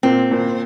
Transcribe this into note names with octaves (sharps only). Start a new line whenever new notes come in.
A#2 C4
A#2